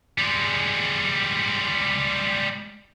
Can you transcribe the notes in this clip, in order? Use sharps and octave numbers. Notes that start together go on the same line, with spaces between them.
G3 G#3